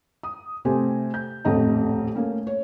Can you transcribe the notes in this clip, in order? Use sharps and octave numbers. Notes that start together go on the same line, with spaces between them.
D#6
C3 A3 G4 C5 G#5
G6
D#1 A1 F2 A3 D#5 A#5
A3 A#3 C#4
C#5